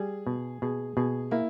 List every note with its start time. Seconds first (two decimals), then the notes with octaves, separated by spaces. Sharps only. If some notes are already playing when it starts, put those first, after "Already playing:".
Already playing: G3 G#4
0.27 B2
0.62 B2 G#4
0.97 B2 G#4
1.31 A#3 E4